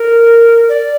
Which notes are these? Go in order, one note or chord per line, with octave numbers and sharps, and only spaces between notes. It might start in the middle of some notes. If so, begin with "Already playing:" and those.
Already playing: A#4
D5